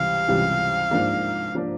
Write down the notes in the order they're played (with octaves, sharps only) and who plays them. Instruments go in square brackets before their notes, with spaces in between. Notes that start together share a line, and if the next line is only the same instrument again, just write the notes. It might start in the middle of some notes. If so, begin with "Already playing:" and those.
Already playing: [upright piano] C#2 C3 E3 G3 [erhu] F5
[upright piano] C#2 C3 E3 G3
G#2 F3 A#3 D4
F3 A#3 D4